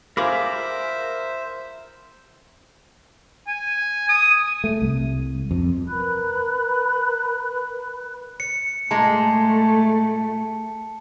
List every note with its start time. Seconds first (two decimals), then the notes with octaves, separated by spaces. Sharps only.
0.17 F4 G#4 A#4 C5 E5 B5 D6
3.47 G#5
4.09 D#6
4.64 A3
4.82 C2
5.51 F2
5.87 A#4 B4 B5 F#6
8.40 C#7
8.91 A#2 G#3 A3 A5